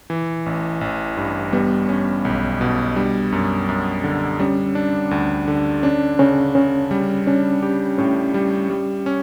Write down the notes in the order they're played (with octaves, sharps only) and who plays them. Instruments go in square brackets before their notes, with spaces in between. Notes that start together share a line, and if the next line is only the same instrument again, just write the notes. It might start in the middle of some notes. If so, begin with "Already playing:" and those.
[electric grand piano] E3
A1
A1
G2
[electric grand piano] G3 [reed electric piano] B3
[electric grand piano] C#4
B1
B2
[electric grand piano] G3 [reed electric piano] D4
[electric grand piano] F#2
F#2
D3
[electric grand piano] G3 [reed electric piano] C#4
[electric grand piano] D4
D2
D3
[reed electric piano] C#4 [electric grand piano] D4
[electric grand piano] C#3 [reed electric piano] C#4
[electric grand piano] C#3 [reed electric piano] C#4
[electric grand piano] G3
[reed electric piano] C#4 [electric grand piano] D4
[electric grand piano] G4
[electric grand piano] A2 [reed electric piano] C#4
[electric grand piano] G3
G3
C#4